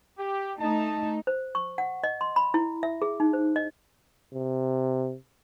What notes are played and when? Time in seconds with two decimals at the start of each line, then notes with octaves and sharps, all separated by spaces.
0.18 G4
0.59 A3 D#4 A5
1.27 C5
1.55 C#6
1.78 F#5
2.04 D#5
2.21 C6
2.36 B5
2.54 E4
2.83 E5
3.02 G#4
3.20 D#4
3.33 C5
3.56 D#5
4.34 C3